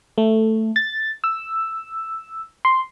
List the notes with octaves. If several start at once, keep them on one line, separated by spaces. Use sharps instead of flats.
A3
A6
E6
C6